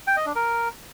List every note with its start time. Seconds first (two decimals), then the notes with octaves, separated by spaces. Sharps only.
0.07 G5
0.17 D#5
0.26 D4
0.36 A#4